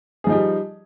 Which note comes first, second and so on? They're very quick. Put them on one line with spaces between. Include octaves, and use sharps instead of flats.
G#4 F3 D#4 G3